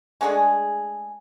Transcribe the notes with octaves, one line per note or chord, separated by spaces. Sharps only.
G#3 A3 D4 G#4